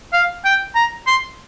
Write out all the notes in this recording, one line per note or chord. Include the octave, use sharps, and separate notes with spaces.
F5
G5
A#5
C6